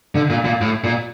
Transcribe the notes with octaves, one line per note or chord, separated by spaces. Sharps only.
D3
A#2
A#2
A2
A#2